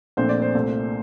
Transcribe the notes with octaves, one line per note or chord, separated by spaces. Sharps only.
A#1 A#2 A3 C4 C5
D5
C5
C2 A#2 A3